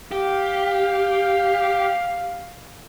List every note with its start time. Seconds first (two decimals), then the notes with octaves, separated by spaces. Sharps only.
0.12 G4 F5